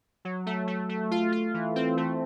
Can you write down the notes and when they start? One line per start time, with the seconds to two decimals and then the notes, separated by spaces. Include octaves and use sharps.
0.25 F#3
0.46 A3
0.68 A3
0.89 A3
1.11 F4
1.32 F4
1.54 E3
1.76 C4
1.97 A3